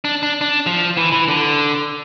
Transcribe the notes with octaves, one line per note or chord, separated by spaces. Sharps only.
D4
D4
D4
F3
E3
E3
D3